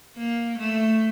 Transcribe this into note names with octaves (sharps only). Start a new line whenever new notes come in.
A#3
A3